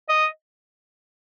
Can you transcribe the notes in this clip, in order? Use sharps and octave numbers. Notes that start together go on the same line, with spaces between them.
D#5